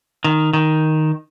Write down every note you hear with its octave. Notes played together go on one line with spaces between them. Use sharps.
D#3
D#3